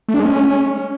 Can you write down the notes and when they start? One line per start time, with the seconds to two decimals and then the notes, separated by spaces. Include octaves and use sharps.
0.09 A3
0.14 D4
0.20 G#3
0.25 C#4